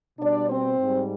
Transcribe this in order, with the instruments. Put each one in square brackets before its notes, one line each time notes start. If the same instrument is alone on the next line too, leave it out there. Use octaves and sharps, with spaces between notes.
[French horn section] B2 G3 D4 D5
C4 C5
G#2 G3